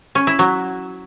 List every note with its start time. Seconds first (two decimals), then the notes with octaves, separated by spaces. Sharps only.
0.15 C#4
0.27 E4
0.39 F#3